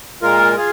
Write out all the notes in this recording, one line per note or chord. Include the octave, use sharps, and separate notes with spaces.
A#2 G#3 F4 A#4
F4 G#4